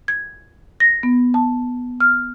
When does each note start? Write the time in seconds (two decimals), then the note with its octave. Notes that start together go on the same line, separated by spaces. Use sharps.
0.08 G#6
0.80 A#6
1.03 B3
1.34 A5
2.00 F6